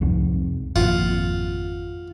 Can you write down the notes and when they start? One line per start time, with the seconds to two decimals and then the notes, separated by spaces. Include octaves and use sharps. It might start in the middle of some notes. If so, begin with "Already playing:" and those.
0.01 C2 F2 G#2
0.76 G#1 F2 A#2 F4 F#5